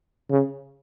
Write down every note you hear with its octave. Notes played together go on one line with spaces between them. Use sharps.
C#3